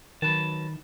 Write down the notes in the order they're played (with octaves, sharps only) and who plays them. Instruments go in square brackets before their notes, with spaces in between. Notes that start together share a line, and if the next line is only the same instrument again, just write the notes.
[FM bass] D#3 [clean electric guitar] F#3 B4 A5